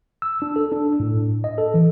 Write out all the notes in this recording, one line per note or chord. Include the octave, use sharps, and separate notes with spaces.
E6
D4
A4
D4
A2
D#5
A4
E3